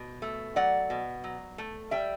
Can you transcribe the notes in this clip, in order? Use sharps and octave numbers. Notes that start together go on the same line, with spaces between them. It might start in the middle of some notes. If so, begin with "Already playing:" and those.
Already playing: B2
A3
F#3 D5 F#5
B2
F#3
A3
G3 E5 G5